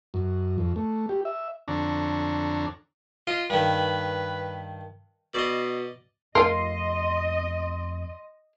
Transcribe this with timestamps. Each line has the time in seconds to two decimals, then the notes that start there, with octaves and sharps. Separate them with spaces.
0.14 F#2
0.58 F2
0.76 A3
1.09 G4
1.25 E5
1.68 F2 D3 D4 C#5 A#5
3.27 F4 D#5
3.50 G2 D#3 B4
5.34 B2 D5 D#5
6.35 F2 A3 F4 A#4 D#5 C6